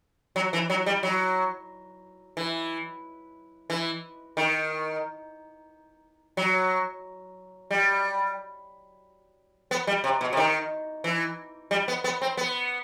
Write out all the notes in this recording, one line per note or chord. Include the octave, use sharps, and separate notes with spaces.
F#3
E3
F#3
G3
F#3
E3
E3
D#3
F#3
G3
B3
G3
C3
B2
C3
D#3
E3
G3
B3
B3
C4
B3